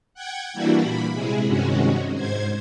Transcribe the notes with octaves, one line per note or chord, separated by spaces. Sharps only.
F#5 G5 G#6
E3 G3 A#3 D4 E4 F#4
A#2 B5
C3 G#3 E4 G#4
G2 C3 D#3 G#3 C#4 F#4
G#2 C5 G#6